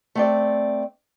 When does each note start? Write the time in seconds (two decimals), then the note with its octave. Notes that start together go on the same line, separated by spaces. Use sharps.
0.15 A3 C4 D5